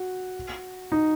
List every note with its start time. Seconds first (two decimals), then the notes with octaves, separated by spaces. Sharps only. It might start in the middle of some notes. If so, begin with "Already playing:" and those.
Already playing: F#4
0.92 D#4